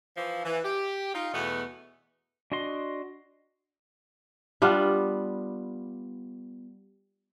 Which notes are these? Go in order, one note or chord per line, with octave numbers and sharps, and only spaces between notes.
E3 F3
E3
G4
D#4 F4
E2 B2 A3 B3
D4 F#4 D#5 C6
G3 B3 D4 F4